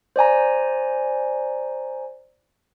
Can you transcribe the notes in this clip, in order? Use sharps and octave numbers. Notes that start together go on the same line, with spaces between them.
C5 D5 G#5 A#5